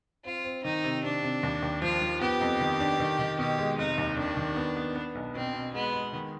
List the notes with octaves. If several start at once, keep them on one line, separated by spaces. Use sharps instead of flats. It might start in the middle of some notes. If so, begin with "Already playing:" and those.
C4 F4
C4
D#3 D#4
C3
C3 D4
C3
D#2
D#2
F3 F4
F3
B3 G4
F2
D#3
D4
D#3
D#3
B2 G4
G#3
F1 D#4
D#2
D#3 D4
D#3
B3
B3
B3
B1
B2 C4
B2
G#3 B3
G#3
D#3